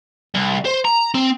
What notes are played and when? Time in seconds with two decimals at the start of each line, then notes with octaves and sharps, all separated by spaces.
0.35 C2
0.66 C5
0.85 A#5
1.14 C4